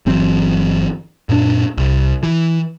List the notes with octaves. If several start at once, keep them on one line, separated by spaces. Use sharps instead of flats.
G1 E3 F#3 C4
F#2 A#2 C4 D4
C2
E3